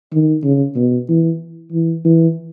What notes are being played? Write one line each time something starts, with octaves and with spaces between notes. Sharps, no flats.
D#3
C#3
B2
E3
E3
E3